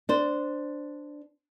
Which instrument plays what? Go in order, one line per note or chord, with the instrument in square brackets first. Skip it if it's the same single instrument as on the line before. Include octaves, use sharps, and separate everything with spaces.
[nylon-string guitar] D4 C5